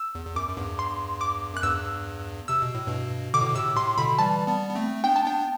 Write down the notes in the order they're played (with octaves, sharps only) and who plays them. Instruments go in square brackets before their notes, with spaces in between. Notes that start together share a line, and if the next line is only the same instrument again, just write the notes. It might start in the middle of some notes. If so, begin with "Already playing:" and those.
Already playing: [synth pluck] E6
[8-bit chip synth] E2
E2
[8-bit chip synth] F#2 [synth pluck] D6
[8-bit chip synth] F#2
E2 G2
[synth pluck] C6
D6
[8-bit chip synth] F#2 [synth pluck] F#6
[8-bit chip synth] E2 G2 [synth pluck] E6
[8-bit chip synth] C3 [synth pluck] E6
[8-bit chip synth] B2
A2
G2 B2
[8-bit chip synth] B2 D3 [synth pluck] D6
[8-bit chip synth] A2
B2
[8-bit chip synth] A2 C3 [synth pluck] E6
[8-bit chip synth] A2 C3 [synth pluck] C6
[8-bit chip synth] B2 D3 [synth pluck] B5
[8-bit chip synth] E3 G3 [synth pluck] A5
[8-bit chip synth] G3 B3
B3
A3 C4
[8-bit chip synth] B3 D4 [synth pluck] G5
[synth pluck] A5
[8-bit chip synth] B3 D4 [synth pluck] G5